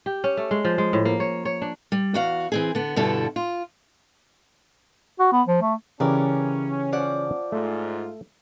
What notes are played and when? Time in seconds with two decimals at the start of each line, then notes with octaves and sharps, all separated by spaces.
0.06 G4
0.24 C#4
0.37 A3
0.51 G#3
0.65 F3
0.78 G#3
0.93 A2
1.05 A#3
1.20 C#5
1.45 C#5
1.62 D4
1.92 G3
2.14 E2 F#4 F5
2.52 E3 C4 G#4
2.75 D3 B3
2.96 G2 B2 D3 G3 E4 A4
3.36 F4
5.20 F#4
5.32 B3
5.48 F3
5.62 A3
6.00 C#3 E3 C#4 G4 A#4 B4 D5
6.93 F3 D5 F#5
7.52 G#2 A3 F4